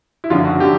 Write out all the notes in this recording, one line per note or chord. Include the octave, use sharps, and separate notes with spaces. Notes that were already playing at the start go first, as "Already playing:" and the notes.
E4
G#1 F#2 D3 F3 F4
F#4
D3 F3 G4